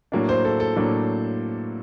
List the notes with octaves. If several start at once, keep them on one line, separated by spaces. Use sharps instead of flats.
A2 F#3 A#3 D4
C5
A4
A4
A2 F#3 A#3 D4